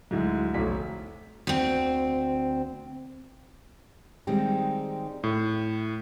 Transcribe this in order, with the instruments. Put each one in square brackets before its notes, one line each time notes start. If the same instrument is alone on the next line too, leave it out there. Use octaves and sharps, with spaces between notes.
[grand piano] D2 G#2 [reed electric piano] F#3 E4
[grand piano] F1 B1 B6
[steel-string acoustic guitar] D2 C4
D#3 G3 G#3 C4 D#4 G4
[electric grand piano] A2